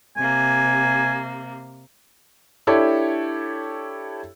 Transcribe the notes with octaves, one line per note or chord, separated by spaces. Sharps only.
C3 A#3 G#5
D4 E4 G4 A4 C#5